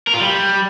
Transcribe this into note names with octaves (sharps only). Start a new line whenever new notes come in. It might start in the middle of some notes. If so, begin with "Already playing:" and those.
A#4
F4
G3